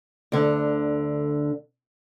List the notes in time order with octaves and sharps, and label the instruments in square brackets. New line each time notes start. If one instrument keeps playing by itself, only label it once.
[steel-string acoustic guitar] D2 D3